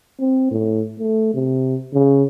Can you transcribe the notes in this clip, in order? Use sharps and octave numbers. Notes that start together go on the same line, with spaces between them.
C4
A2
A3
C3
C#3